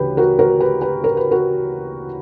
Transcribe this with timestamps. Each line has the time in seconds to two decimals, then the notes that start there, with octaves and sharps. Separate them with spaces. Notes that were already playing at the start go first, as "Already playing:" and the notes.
Already playing: D2 C#3 E3 G4 B4
0.17 F#4 A#4
0.39 F#4 A#4
0.60 G4 B4
0.82 G4 B4
1.04 A#4
1.17 B4
1.31 F#4 A#4